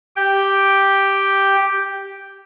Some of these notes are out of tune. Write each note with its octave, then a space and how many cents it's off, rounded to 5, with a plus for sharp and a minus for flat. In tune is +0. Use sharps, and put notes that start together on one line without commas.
G4 +0 G5 +0